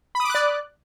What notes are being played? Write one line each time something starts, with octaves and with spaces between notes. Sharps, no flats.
D5 B5 D6 D#6 F#6